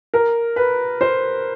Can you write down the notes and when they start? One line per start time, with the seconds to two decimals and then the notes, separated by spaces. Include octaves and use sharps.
0.14 A#4
0.56 B4
1.01 C5